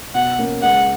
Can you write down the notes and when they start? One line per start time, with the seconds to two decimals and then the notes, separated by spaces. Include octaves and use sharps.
0.15 B2 F#5
0.38 A#3 C#4
0.63 C#2 F#5